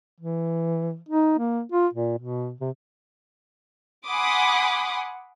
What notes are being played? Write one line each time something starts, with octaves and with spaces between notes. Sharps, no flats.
E3
D#4
A#3
F4
A#2
B2
C3
F#5 G#5 B5 C6 D6 D#6